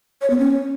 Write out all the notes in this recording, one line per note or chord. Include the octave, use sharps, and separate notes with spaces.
C#5
B3
C#4